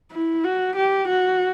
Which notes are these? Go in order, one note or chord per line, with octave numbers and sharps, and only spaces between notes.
E4
F#4
G4
F#4